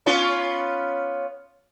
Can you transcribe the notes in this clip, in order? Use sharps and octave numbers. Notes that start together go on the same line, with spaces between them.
B3 C#4 F4